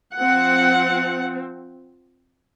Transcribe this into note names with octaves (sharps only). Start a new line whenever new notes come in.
F3 C4 F#5